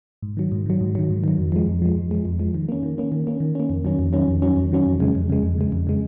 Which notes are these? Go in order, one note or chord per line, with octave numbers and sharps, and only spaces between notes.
G#2
D#3 F#3
G#2
D#3 F#3
G#2
D#3 F#3
G#2
D#3 F#3
F2
F3 G#3
F2
F3 G#3
F2
F3 G#3
F2
F3 G#3
D#3
A#3 C#4
D#3
A#3 C#4
D#3
A#3 C#4
D#3
A#3 C#4
F2
D#3 F#3 C#4
F2
D#3 F#3 C#4
F2
D#3 F#3 C#4
F2
D#3 F#3 C#4
F2
C#3 G#3
F2
C#3 G#3
F2
C#3 G#3
F2
C#3 G#3